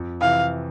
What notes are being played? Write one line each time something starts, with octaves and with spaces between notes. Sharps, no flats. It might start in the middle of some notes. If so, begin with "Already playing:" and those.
Already playing: F2
C3 E3 F5